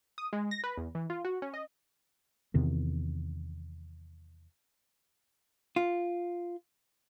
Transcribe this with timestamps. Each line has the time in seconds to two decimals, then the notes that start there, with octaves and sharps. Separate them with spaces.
0.18 D#6
0.33 G#3
0.51 A#6
0.64 B4
0.77 E2
0.95 E3
1.10 F4
1.25 F#4
1.42 C#4
1.54 D#5
2.54 E2 C3 D#3
5.76 F4